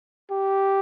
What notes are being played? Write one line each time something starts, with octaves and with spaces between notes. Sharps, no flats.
G4